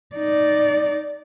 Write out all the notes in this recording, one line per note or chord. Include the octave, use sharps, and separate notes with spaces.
D#4 D5